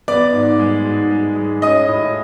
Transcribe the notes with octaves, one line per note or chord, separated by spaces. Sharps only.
B3 D5 D6
G#2
G#3
G#2
G#3
G#3
C#4 D#5 D#6
A2